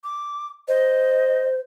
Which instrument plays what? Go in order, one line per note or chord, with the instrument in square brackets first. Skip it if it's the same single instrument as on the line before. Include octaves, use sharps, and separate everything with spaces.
[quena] D6
[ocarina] C5 [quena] D#5